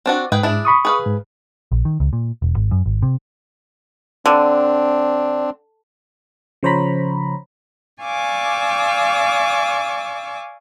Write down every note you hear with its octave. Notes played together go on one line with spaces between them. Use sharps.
C4 D4 F#4
G#2 G#4 B4 G5
D4 E4 G#4
B5 C#6 D#6
G#4 B4 F5
G#2
A#1
D#3
C#2
A#2
E1
G#1
F#2
G#1
C3
D3 C4 D4
C#3 F3 C5 C#5 A#5 B5
D5 F5 G#5 C#6 D6 E6